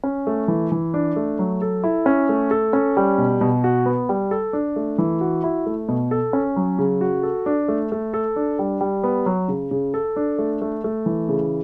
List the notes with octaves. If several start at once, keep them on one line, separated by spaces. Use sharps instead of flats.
C#4
A3
E3
E3
D4
A3
F#3
A4
E4
C#4
A3
A4
C#4
G3
B2
B2
F#4
B3
G3
A4
D4
A3
E3
F#4
E4
A3
B2
A4
C#4
F#3
C#3
F#4
A4
D4
A3
A3
A4
D4
G3
G3
B3
F#3
C#3
C#3
A4
D4
A3
A3
A3
E3
C#3